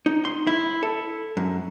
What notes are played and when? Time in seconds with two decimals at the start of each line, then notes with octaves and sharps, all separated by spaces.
0.06 D#4
0.25 C6
0.47 E4
0.83 A4
1.37 F#2